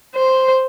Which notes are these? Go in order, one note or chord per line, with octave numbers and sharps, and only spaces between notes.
C5